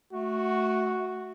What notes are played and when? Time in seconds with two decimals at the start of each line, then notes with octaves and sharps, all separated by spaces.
0.13 A3 F#4